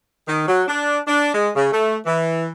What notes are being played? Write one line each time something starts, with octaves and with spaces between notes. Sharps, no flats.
D#3
F#3
D4
D4
G#3
C#3
A3
E3